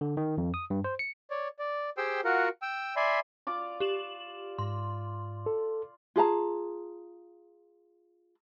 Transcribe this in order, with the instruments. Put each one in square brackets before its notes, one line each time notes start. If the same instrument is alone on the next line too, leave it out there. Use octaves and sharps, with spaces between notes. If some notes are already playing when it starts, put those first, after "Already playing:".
[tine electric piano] D3
D#3
F2
D#6
G2
C5
C#7
[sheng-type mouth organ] C#5 D5
D5
G4 G#4 C5 G5 C6 E6
F4 F#4 A#4 F#5
G5 E6
D5 E5 G#5 B5 C6
[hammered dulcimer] F4 D5 D6
[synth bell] G4 E7 F#7
[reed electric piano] G#2 [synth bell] C6
[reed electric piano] A4
[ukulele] F4 G#4 A5 A#5